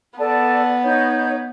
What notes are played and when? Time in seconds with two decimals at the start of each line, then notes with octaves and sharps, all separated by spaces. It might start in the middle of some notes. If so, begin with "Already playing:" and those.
0.18 B3 A4 D5 A5
0.84 D#4 C#5 G6